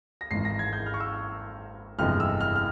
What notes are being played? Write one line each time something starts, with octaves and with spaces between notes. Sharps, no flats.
A#6
G#1 G#2 E3 C7
A#6
G#6
G6
F6
C#6
E6
G1 F2 C3 E3 G#3 F6
E6
F6
F6